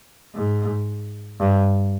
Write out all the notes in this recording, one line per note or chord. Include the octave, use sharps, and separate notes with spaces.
G#2
G2